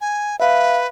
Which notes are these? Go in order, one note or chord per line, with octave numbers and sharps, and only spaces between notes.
G#5
B4 E5 F5